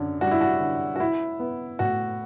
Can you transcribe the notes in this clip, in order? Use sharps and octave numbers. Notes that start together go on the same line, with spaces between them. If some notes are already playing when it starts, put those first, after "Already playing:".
Already playing: F#2 D3
G3 F#4
E4
F#4
D3
F#4
E4
B3
A2 F#4